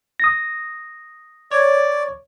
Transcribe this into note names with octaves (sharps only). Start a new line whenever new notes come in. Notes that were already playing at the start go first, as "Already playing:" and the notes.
D#6 A#6
C#5 D5